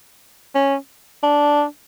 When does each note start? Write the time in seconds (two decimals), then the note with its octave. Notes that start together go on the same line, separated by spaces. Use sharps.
0.55 C#4
1.23 D4